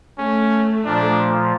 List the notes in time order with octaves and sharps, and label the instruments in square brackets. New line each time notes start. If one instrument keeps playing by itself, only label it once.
[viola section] A3 [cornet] C#4
[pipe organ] A#2 F3 [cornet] D4